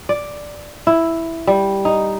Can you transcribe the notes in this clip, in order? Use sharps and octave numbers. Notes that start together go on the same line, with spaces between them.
D5
E4
G3
D#4